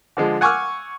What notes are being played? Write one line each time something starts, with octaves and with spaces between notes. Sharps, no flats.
D3 F3 G#3
F#5 G#5 C#6 D6 E6 F6